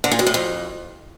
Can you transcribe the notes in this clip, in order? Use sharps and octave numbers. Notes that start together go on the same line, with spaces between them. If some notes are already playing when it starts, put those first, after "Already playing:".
D3
A#2
F#2
A2
F2